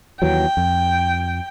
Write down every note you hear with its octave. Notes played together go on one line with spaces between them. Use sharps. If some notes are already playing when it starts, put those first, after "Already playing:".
D#2 E3 F#3 G5
F2